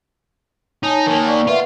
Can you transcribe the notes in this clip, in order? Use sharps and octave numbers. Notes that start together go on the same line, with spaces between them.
D#4 C#5 G#5 A5
D#3 A#3
D5 C#6
F4 B4 E5 F#5